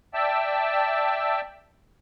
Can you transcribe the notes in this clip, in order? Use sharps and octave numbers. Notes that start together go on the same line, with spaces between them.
D5 E5 G5 A5 E6